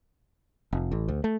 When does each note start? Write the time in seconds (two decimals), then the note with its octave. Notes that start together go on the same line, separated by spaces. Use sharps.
0.73 F1
0.92 A1
1.08 D2
1.24 A3